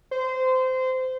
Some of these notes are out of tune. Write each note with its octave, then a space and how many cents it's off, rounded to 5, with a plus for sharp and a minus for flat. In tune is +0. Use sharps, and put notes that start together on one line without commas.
C5 -20